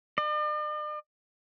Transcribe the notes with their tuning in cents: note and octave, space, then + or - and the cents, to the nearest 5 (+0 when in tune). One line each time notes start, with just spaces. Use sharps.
D5 +45